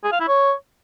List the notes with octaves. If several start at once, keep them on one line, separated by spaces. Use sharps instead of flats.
G#4
F5
E4
C#5